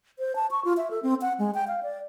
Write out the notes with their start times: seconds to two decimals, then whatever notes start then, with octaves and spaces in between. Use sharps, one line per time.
0.19 C5
0.36 A5
0.51 C#6
0.65 F4
0.77 E5
0.91 A4
1.03 C4
1.22 F#5
1.39 G#3
1.54 G5
1.68 F5
1.83 D5